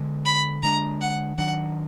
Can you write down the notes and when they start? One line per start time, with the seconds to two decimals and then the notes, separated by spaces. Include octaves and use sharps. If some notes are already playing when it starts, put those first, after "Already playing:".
Already playing: D3 G#3 B3
0.25 B5
0.63 D3 G#3 D4 A#5
1.01 F#5
1.38 D#3 F#3 D4 F#5